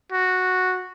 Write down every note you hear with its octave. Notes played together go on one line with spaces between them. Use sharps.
F#4